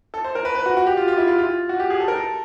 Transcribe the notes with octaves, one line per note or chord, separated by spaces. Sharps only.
A4
C5
A#4
B4
B4
F#4
F#4
G4
F4
F4
E4
F4
F4
F#4
G4
G#4
A4
A#4
A4